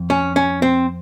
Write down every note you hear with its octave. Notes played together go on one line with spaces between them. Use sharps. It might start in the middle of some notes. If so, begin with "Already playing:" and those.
Already playing: F2
C#4
C#4
C4